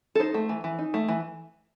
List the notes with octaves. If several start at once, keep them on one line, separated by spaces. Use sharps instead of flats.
A4
D#4 C5
A3
E3
E3
D#4
A3
E3